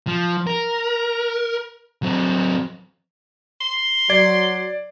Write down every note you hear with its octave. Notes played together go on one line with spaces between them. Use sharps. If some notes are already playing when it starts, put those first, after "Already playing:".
F3
A#4
F#3 C4
C6
F#3 D5 G#6 C7